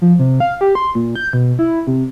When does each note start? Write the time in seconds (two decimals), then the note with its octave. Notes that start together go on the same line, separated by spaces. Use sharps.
0.01 F3
0.19 C3
0.40 F5
0.61 G4
0.75 C6
0.95 A#2
1.16 G6
1.33 B2
1.59 E4
1.87 C3